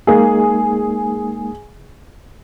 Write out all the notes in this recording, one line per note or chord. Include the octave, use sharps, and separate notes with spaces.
G#3 A#3 D#4 G#4